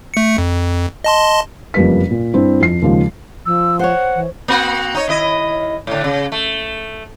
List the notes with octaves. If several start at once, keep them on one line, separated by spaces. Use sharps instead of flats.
A3 C#7
F2
D#5 A5 C6
F#1 F2 G3 A#3 B4 B6
A#2
G2 C4 D4 E4
F2 C7
D#2 C#3 F3 G#3
F3 E6
C5 C#5 F#5
E3
A#3 C4 F#4
D#4 C#5
D#2 E4 D#5
A2 D3
C#3
A3